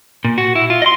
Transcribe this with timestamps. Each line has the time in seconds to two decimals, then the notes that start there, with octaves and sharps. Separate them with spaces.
0.24 A#2
0.38 F#4
0.56 E4
0.70 F4
0.82 D#5 C6